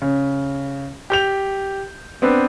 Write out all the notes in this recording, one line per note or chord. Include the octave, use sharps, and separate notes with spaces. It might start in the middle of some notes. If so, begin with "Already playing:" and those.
C#3
G4 G6 F7
B3 C4 D4 B4